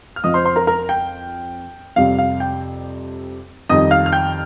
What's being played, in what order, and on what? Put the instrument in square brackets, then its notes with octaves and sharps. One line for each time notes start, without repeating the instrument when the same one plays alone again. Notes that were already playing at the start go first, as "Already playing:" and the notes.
[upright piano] F6
F2 F3 D#5 D#6
C5 C6
C5 C6
A#4 A#5
A#4 A#5
G5
F2 C3 G3 F5
F5
G5
F2 D#3 G3 D#5 D#6
F5 F6
F6
G5 G6